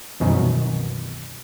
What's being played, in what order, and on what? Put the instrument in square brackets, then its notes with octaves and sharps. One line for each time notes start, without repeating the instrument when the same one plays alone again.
[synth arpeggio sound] C2 F#2 B2 D#3 E3